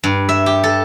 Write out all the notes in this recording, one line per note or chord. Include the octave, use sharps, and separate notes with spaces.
G2
E5
G4
A4